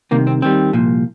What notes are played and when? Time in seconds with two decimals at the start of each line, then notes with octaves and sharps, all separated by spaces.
0.11 C2 C3 D#3 A#3
0.27 C4
0.42 D#2 D#3 G3 C4
0.73 C2 A#2 F3